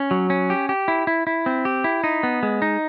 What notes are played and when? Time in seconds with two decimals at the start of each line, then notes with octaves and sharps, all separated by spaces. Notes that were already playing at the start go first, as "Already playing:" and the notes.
Already playing: C#4
0.11 F#3
0.30 C#4
0.50 G4
0.69 G4
0.88 E4
1.07 E4
1.27 E4
1.46 C4
1.65 G4
1.84 E4
2.04 D#4
2.23 B3
2.43 G#3
2.62 D#4